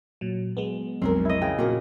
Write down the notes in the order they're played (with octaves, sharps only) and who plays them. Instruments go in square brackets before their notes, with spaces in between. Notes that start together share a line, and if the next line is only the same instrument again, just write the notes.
[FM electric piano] A#2 F#3
F#3 G#3 B3
[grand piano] B1 F2 [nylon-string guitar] C4 C#4 A#4
[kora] E4 D#5
[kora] C#3 [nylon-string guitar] G5
[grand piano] A#2 [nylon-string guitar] F#4 A#4